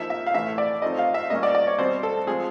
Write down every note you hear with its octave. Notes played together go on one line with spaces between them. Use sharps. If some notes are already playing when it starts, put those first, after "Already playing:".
Already playing: F3 A#3 D#4 E5
E5
F5
A2 E3 A3 E5
D5
F3 A3 C4 D#4 D#5
F5
E5
A#2 G3 A#3 C#4 D#5
D5
D5
C#5
B2 G3 C4 C5
A4
F3 G#3 C4 G#4